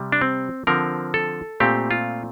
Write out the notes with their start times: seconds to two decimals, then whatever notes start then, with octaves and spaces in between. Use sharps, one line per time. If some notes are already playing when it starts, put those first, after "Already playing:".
Already playing: C3 G3
0.12 D4
0.21 C4
0.67 D3 F3 C4 A#4
1.14 A4
1.60 A#2 A3 C4 G4
1.91 F4